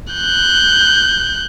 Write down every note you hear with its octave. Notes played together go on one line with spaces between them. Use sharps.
F#6 G6